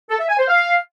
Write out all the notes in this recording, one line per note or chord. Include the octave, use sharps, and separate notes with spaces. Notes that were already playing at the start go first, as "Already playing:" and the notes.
A4
E5
G#5
C5
F5